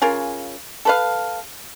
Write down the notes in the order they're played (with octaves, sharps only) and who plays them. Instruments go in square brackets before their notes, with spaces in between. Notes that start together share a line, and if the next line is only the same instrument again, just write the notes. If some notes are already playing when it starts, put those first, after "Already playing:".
[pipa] C#3 F4 A#4 G#5
A4 B4 F5